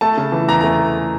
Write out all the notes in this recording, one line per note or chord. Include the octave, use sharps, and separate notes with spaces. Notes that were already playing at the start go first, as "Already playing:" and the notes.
A3 A5
C#3
E3
E2 A#5
A3 A#5